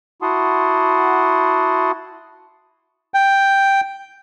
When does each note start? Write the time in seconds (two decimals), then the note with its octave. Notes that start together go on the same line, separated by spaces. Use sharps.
0.22 E4 F#4 F#5 A5 C6 D#6
3.14 G5